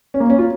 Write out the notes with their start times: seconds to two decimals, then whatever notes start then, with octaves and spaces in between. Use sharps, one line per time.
0.14 C#4
0.20 A#3
0.30 C#4
0.38 F4